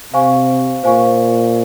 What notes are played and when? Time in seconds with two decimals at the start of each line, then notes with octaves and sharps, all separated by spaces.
0.13 C3 C5 F5 G#5 C#6
0.84 A#2 C5 F5 G#5 C#6